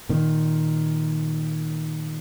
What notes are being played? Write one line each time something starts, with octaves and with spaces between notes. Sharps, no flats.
A#2 D#3